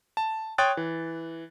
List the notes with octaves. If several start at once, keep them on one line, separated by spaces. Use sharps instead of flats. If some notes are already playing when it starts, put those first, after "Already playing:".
A5
C#5 G5 C6 D#6 F#6 A6
E3